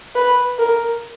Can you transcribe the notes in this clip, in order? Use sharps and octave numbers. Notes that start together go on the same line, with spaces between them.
B4
A#4